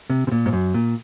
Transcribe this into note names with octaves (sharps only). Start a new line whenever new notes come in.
C3
C3
A#2
G#2
F#2
A#2